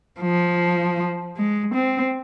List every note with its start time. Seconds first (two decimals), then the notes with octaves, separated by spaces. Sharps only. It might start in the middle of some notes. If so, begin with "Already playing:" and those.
0.20 F3
1.37 G#3
1.75 C4